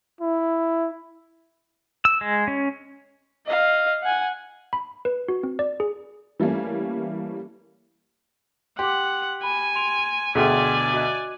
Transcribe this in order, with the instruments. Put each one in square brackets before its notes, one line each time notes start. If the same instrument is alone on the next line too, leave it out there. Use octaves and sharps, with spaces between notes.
[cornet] E4
[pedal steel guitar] E6
G#3
C#4
[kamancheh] D#5 F5
F#5 G#5
[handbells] B5
B4
F#4
C4
D5
G#4
[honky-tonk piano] E3 G3 A3 A#3 C#4
[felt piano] G4 [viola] F#5 [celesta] C6 D6
[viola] G#5 [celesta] B5
[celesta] C6 D7 F7
[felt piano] D2 B2 D3 [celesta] G#4 G5 C6 [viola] D5 G#5
[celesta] F#4 D#5 F#6